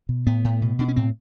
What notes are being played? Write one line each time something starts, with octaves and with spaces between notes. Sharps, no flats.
B2
A2 B3
A2
B2
B2 D4
C#4
A2 C4